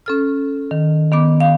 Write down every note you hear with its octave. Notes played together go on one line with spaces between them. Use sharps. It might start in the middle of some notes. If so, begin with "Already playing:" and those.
C#4 A4 F6
D#3
D#3 B3 D6
F5